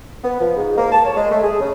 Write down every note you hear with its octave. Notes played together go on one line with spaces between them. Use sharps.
B3
F3
G#2
A#3
A5
C#5
G#3
A3
G#4
C#3